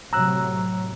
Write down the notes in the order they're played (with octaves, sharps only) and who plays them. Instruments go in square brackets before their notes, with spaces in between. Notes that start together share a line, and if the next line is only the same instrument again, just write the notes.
[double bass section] A2 C3 F#3 [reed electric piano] A#5 E6 F#6